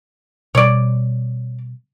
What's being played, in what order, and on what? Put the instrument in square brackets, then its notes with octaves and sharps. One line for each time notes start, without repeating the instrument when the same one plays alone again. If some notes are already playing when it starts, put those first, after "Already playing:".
[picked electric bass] B2 G3 [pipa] C#5 D5